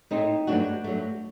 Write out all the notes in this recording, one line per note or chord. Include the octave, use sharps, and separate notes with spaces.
A2 A3 C4 D#4
G2 F#3 A3 D4 F#4
G2 F#3 A3